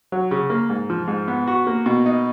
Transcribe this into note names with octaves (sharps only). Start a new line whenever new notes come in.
F#3
C#3
A#3
G#2
F3
G#2
B3
F#4
A#3
B2
D#4